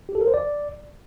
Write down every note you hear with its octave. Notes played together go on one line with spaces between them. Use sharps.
G4
A4
A#4
C5
D5